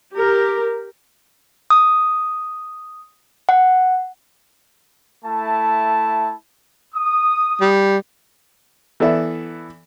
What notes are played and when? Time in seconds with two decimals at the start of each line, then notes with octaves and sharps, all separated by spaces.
0.15 G4 A#4
1.70 D#6
3.49 F#5
5.25 A3 E4 A5
6.95 D#6
7.61 G3
9.00 E3 B3 A4 D5 E5